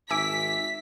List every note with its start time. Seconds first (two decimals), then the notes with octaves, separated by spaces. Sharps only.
0.11 G#1 E5 G#5 D6 B6